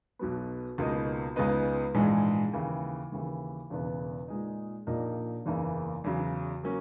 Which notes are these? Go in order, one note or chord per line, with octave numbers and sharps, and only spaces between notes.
B1 B2 F#3 B3
C#2 B2 A#3 D#4
C#2 C#3 G#3 B3 D#4
A#1 G#2 E3 G#3
D#2 C#3 E3
D#2 C#3 E3
E1 E2 C#3 E3 B3
A#2 G#3 D#4
A#1 A#2 A#3 D#4
F#1 E2 C#3 E3 A#3
E2 C#3 F#3
F#3 A#3 C#4